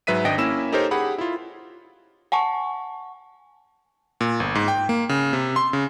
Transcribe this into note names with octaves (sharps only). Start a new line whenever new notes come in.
G#2 F#3 B4 E5 B6 D#7
G#1 D4 D#5 G5 A#6 D7
A#3 C#4 E4 E6 E7
D#4 G4 A4 A#4 C5 C#5
G4 G#4 F#5 B5
E4 F4
F#5 G#5 A5 C#6
A#2
G1
G#2
G5
A#3
C#3
C3
C6
C#3